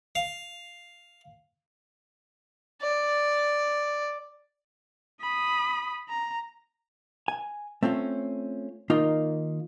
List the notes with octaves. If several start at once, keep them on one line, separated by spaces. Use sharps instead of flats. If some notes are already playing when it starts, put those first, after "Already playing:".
F5
D5
B5 D#6
A#5
G#5
A3 C4 C#4 F4
D#3 A#3 D#4 F4